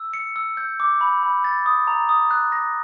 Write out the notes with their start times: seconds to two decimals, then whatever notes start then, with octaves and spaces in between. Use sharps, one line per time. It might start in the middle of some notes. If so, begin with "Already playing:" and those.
Already playing: E6
0.13 C#7
0.36 E6
0.57 G6
0.80 D6
1.01 B5
1.23 B5
1.44 A6
1.66 D#6
1.87 A#5
2.09 D#6
2.31 F#6
2.52 A#6